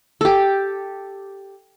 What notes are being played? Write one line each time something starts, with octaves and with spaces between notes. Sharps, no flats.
G4 A4